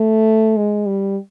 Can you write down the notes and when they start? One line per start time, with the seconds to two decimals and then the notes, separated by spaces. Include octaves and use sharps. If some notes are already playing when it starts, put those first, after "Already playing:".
Already playing: A3
0.57 G#3
0.86 G3